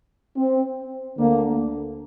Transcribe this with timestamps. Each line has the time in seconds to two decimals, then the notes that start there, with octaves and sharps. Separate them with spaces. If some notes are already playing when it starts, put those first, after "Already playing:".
0.37 C4
1.17 D2 D3 A#3